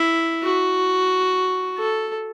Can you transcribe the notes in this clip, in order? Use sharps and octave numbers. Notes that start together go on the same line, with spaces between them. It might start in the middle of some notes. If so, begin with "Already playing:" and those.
Already playing: E4
F#4
A4